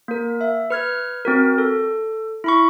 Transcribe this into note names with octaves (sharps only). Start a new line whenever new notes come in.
A#3 A#4
E5
B4 F6 G#6
C4 F#4 A#4
A4
E4 B5 C#6